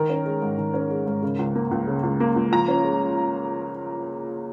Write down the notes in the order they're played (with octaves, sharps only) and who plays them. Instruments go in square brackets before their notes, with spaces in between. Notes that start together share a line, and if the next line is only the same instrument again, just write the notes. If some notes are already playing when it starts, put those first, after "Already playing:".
Already playing: [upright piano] D#3 A#4
C#4
G#3
G#2
D#3
C#4
G#3
G#2
C#3
C#2
A#3
C#2
C#3
C#2
A#3
C#2
F3 A#5
C#4
G#3